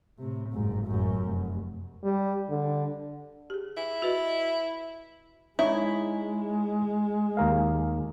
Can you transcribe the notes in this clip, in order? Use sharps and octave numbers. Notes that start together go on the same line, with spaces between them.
A2 C3
F#1 G#2
A1 F#2
F1
G3
D3
G4 G#4
E4
F#4 B4 D#5
G#3 D#4 E4 C#5 D#5
D#2 A#4 F5